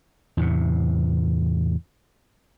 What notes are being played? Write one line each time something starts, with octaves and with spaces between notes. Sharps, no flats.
E2 A2 C3